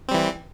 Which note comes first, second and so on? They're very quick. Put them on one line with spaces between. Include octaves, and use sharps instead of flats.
C4 G3 E3